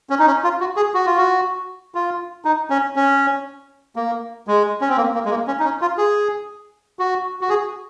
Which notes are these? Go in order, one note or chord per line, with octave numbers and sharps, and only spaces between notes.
C#4
D#4
C#4
F4
F#4
G#4
F#4
F4
F#4
F4
D#4
C#4
C#4
A#3
G#3
C#4
C4
A#3
A#3
G#3
A#3
C#4
D#4
C#4
F4
G#4
F#4
F#4
G#4